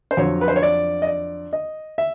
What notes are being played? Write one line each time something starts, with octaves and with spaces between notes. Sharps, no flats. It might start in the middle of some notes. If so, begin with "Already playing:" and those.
C5
F2 D3 F#3 C#5
B4
C5
C#5
D5
D#5
D5
D#5
E5